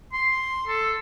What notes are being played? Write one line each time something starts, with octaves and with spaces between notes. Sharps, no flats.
C6
A4